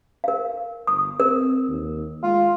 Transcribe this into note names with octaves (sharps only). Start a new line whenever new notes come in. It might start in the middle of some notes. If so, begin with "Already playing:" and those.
A#4 F5
G1 D#6
C4 A#4
D#2
G#3 F4